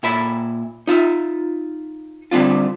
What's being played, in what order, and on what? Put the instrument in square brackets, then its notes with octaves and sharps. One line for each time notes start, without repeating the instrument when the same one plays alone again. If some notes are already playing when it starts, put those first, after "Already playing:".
[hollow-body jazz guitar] A#2 E5 B5
D#4 F4 E5
D3 G3 C4 D4 F4